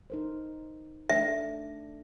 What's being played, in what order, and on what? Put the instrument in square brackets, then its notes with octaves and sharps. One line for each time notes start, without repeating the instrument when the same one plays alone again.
[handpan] D#4 A#4 C5
[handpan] A3 D4 [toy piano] E5